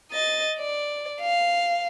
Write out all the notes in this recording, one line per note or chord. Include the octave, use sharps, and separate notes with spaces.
D#5 A6
D5
F5